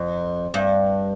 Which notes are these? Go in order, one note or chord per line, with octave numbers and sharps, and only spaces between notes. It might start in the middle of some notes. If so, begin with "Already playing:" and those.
Already playing: F2
G2